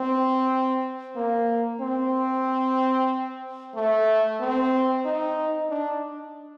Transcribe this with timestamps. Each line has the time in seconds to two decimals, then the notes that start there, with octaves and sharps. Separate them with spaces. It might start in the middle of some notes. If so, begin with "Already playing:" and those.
Already playing: C4
1.16 A#3
1.81 C4
3.75 A3
4.40 C4
5.05 D#4
5.70 D4